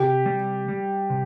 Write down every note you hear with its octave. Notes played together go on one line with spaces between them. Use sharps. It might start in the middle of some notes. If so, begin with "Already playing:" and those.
Already playing: C3 G4
G3
G3
C3